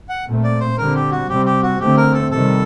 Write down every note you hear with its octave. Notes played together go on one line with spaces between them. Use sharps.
F#5
A#2 A3 C4
D5
C5
D3 G3 C4 A#4
G4
F#4
C3 G3 C4 G4
G4
F#4
D3 A3 C4 G4
A#4
A4
C3 D#3 G3 A4